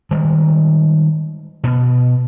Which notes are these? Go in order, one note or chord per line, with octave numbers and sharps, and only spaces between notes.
D#3 G3 G#3
B2 B3